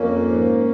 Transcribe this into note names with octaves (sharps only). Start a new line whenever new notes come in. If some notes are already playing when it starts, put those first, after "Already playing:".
Already playing: F2 A#3 C#4
G#2